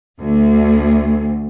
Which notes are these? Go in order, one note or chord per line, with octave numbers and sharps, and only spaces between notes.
D2